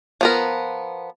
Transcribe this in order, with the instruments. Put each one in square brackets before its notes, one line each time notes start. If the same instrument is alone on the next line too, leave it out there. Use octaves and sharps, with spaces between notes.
[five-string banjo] F3 B3 A#4